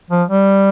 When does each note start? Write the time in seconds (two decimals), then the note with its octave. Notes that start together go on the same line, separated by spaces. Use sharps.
0.11 F3
0.29 G3